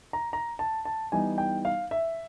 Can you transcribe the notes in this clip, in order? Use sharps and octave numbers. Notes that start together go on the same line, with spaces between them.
A#5
A#5
A5
A5
E3 G3 B3 D#4 G#5
G5
F5
E5